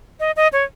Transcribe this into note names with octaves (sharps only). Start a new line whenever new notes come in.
D#5
D#5
C#5